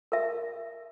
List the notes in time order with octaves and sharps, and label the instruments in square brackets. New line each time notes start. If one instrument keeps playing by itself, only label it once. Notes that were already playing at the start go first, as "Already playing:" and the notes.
[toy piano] A#4 E5